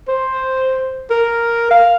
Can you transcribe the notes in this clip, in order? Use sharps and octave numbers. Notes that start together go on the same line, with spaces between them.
C5
A#4
F5